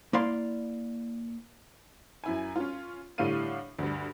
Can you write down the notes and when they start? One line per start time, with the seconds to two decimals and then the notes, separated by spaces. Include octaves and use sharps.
0.13 A#3 E4 D5 F5 C6
2.24 F#2 E4 G#5
2.56 C#4 F4
3.18 A2 D3 G3 D4 F5 D#7
3.79 D2 G2